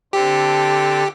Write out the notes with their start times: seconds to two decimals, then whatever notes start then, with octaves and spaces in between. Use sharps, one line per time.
0.13 D3 C4 G4 A4